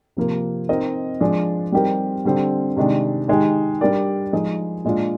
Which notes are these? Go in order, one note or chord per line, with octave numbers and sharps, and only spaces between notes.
C3 F3 A#3 F4
C4 D#4 A#4 D#5
F3 G#3 D4 G#4 D5
G3 C4 D#4 G4 A#4
D3 G3 C4
C3 D#3 G#3 D4
D#3 G#3 D#4 G4
G3 D4 G4 A#4 D5
F3 G#3 D#4 G#4
A#2 G#3 D4 F4